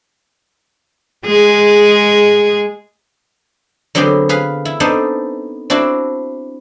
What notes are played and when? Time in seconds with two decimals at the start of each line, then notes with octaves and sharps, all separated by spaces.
1.26 G#3 G#4
3.95 D3 F#3 B3 C4 G4 G#4
4.29 G#4 B4 F5
4.65 E4
4.80 B3 C4 D4 D#4 A4 C5
5.70 C4 D4 E4 F#4